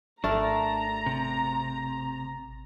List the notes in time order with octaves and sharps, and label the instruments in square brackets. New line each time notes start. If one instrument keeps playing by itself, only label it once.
[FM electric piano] G#1 A6 [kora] A3 A#4 [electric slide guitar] D4 [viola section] A#5
[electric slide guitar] C3